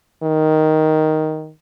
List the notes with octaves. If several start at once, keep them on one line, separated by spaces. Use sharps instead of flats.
D#3